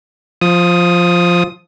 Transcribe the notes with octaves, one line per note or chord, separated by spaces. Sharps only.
F3 D#6